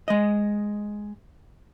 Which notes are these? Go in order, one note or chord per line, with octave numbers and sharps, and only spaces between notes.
G#3 D#5